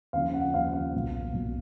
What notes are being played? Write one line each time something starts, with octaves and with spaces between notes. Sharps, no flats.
D#2 C#3 F3 F5
F#5
D#2 C#3 F3 F5
F5
B1 A#2 F#3
B1 A#2 F#3